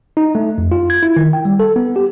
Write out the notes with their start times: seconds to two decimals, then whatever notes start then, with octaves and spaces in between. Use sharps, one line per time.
0.17 D#4
0.35 A3
0.58 F2
0.72 F4
0.90 G#6
1.03 E4
1.16 D#3
1.33 G5
1.45 G3
1.60 A4
1.76 B3
1.96 G4